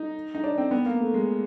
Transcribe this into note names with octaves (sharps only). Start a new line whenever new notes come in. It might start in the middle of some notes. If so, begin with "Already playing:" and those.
Already playing: D#4
D#4
D4
C4
B3
A#3
A3
G#3